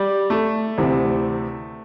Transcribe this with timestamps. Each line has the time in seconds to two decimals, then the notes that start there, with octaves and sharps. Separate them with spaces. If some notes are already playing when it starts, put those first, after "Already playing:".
Already playing: G3
0.30 A3
0.78 D2 C3 E3